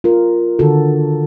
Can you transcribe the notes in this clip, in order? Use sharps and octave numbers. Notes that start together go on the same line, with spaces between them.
F4 A#4
D3 D#3 F#4 A4